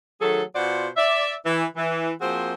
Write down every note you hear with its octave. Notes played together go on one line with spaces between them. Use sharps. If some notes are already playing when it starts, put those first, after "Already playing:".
D#3 F#3 A3 G#4 A4
B2 F4 C5 D5 F#5
D5 E5
E3
E3
F3 A#3 C4 F#4 G#4 C5